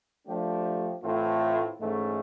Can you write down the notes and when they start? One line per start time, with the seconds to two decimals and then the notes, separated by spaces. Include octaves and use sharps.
0.27 F3 A3 D4 G4
1.02 A2 E3 A3 C4 F4
1.78 G#2 E3 A3 C#4